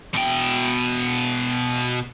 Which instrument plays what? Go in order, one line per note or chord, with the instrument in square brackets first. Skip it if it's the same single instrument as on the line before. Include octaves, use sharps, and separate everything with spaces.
[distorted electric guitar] B2 G5